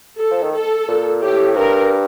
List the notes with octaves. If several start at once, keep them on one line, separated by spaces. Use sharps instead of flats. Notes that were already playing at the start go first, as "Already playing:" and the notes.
A4
F3
D#3
A4
A#2
A2 G4
G2 A#4